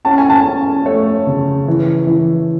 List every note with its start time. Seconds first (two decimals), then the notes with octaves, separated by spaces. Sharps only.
0.05 C#4 A5
0.18 G#5
0.30 A5
0.46 C#4
0.86 A3 C#5
1.27 C#3
1.68 E3
2.07 E3